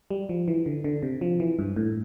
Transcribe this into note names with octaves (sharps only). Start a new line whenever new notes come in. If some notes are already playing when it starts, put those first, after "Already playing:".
G3
F3
E3
D3
D3
C3
F3
E3
G2
A2